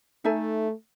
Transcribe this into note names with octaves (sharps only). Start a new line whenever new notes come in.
A3 D#4 A4 E5 G#5